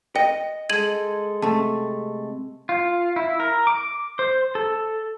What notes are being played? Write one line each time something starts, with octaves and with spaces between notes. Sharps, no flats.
D#5 G5
G#3 A4 G#6 D#7 F#7
C3 A3 A5
F4
E4
A#4
D6
C5
A4